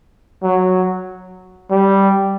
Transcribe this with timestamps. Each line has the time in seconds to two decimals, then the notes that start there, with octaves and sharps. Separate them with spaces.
0.43 F#3
1.71 G3